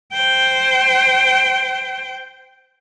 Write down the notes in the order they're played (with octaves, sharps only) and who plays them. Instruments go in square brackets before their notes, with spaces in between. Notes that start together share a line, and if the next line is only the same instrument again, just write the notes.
[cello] C5 G5